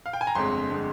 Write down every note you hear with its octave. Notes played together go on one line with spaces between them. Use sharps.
F5
G5
G#5
A#5
G1 F2 D3 G#3 C4 C6
D3 G#3 C4